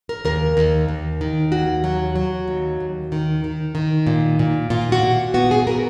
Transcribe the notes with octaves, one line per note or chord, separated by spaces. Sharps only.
A#4
D#2 A#4
D#2
D#2
D#3
D#2 F#4
F#3
F#3
D#2
D#2
D#3
D#3
D#3
A#2
A#2
A#2 F4
F#4
A#2
B3 F#4
G#4
B3 A#4